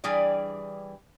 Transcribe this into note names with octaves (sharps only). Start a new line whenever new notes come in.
E3 G3 D4 G#4 D5